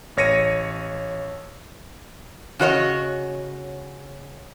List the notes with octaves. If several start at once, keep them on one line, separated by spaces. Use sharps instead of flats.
A1 C#5 A#6 C#7 D#7
C#3 F#4 C#5 D#5